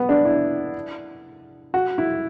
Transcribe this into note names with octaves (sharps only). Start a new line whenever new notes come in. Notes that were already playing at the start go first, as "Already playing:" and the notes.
Already playing: B3
D4
E4
F#4
E4